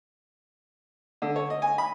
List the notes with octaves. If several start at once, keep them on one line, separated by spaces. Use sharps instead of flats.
D3
C#5
D#5
G#5
B5